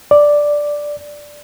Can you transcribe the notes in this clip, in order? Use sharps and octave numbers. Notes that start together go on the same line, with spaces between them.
D5